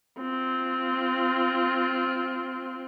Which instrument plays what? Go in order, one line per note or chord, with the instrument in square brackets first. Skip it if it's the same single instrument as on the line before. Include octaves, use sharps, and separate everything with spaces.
[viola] C4 F4